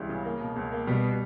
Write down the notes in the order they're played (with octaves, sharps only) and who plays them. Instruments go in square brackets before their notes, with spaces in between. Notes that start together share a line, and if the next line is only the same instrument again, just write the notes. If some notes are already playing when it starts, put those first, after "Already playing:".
Already playing: [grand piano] C#2 E3 G3
C#3
A#3
B2
C#2
A#3
[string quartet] B2 [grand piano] G3